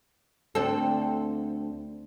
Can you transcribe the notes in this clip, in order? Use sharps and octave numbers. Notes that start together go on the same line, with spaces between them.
D2 C4 A4